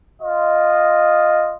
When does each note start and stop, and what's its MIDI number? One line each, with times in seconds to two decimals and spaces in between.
0.22 1.55 65
0.22 1.55 75